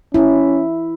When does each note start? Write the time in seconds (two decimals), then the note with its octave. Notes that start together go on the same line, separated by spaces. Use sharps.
0.14 C#4 E4